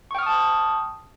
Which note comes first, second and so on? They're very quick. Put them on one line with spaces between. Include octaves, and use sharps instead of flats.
C#6 G5 F6 D#6 A5